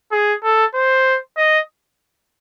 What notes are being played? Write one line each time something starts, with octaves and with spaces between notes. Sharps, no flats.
G#4
A4
C5
D#5